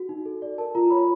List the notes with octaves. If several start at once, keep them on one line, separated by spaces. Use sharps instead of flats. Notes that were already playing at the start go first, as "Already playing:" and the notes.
Already playing: F#4
D#4
A4
D5
A#4 A5
F4 A#5
C#5 B5